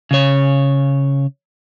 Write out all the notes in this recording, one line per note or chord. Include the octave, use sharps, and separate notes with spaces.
C#3 C#5